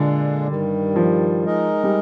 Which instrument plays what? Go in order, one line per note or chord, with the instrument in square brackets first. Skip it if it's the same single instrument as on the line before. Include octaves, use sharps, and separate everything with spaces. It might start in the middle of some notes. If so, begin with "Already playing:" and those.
Already playing: [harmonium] A#2 G#3 D4 F4 [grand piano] D3
[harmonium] G2 D#3 G3
[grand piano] F3
[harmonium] G#3 D#4 A#4 D#5
[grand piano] G3